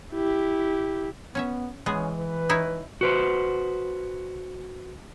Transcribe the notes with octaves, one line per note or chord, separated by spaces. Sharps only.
E4 G4
B3 C#4 C#5 E5
E3 G#3 B3 C#4 G#4
B4
D#4 E4 C#5
F#4 B4 C5